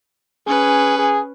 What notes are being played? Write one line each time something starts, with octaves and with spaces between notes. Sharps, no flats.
C#4 G#4 B4
G#4